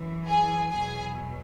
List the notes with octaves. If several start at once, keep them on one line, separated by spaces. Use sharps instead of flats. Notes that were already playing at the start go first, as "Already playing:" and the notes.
Already playing: F#2 E3
G#4 G#5
E2 B2 F#3 G#4 G#5